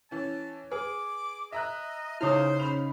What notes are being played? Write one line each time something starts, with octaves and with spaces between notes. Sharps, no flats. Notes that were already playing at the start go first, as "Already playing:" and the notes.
E3 C#4 A5
G#4 B4 D6
D#5 E5 A#5 F#6
C#3 D#4 E4 C5 C#5 D#6 F6
C#4 B5 F7